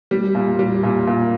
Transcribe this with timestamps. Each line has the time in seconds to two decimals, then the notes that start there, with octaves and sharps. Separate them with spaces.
0.11 G3
0.35 A#2
0.59 G3
0.83 A#2
1.07 A#2